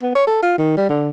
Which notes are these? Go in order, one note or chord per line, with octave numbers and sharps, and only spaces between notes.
B3
C#5
A4
F4
D#3
G3
D3